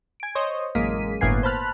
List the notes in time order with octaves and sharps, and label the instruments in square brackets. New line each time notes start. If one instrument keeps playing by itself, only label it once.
[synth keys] G#5 D7
C5 C#5 D#5
A1 F#2 G#3 A#3 B6 D#7
G1 A2 A#3 B3 G#5 C7
C5 A5 B5 F6 F#6